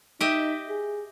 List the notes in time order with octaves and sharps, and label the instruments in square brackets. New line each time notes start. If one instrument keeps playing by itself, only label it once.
[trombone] D#4 [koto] G4 D#5 E5
[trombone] G#4